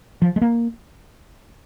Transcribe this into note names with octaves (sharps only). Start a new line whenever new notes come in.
F3
G#3
A#3